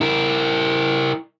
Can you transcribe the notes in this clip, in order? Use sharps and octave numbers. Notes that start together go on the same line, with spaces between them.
E4 A#4